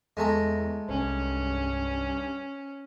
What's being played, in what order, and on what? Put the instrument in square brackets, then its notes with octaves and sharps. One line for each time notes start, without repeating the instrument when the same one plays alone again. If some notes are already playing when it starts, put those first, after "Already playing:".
[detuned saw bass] E2 [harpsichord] G#3 A3 A#5
[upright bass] C2 [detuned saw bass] G2 [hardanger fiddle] C#4